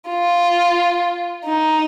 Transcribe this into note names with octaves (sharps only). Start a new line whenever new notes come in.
F4
D#4